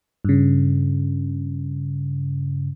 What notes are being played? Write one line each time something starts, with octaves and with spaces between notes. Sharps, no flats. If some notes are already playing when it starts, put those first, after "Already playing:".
G2 C#3